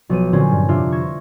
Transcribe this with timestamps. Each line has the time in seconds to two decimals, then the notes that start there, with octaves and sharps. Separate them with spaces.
0.10 B1 F3 D#7
0.33 A#2 D3 F#3 C4 C#4 F4
0.51 G2
0.68 F2 C3 D4 F4 E5
0.92 C6 C#6 G#6 A#6 E7